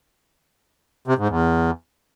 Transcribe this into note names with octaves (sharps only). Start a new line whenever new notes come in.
C3
G#2
E2